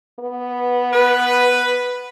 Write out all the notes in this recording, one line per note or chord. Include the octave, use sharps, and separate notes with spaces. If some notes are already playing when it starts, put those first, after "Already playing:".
B3
B4